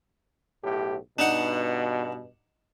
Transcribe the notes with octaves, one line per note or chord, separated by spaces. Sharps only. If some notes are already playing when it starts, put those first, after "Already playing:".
B1 A2 G4
G2 B2 D4 D#4 F#5